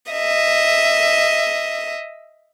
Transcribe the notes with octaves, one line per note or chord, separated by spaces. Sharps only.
D#5 E5